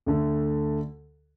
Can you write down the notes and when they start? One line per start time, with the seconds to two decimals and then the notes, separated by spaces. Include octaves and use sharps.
0.06 D2 D3 A3